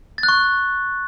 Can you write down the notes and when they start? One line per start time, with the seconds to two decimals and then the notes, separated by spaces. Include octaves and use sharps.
0.18 A6
0.23 F#6
0.29 C#6